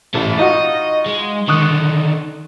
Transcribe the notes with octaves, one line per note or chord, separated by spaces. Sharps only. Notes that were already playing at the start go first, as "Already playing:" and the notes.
A1 G#2 A3
D#4 F4 F#4 D#5
G#3
D3 D#3 C#6 D#6 F#6